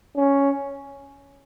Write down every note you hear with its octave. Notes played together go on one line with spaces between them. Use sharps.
C#4